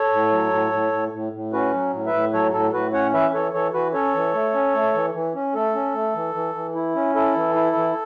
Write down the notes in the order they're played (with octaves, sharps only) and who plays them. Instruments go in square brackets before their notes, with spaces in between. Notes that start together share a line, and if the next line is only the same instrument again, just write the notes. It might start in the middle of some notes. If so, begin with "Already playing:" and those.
Already playing: [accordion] A4 C#5
A2
F#3
A2
A2
A2
A2
A2
C#4 F#4 B4
F#3
A2
B4 E5
A2
F#3 A4 C#5
A2 A4
A2 F#4 B4
C#4 C#5 F#5
E3 B4 E5
E3 A4 C#5
E3 A4 C#5
E3 F#4 B4
C#4 A4 C#5
E3
A3
C#4
A3
E3
E3
C#4
A3 A4
C#4
A3
E3
E3
E3
E4
C#4
E4 A4
E3
E4
E3